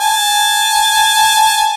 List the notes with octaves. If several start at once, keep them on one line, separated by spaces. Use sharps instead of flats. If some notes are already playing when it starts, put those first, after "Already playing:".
G#5 A5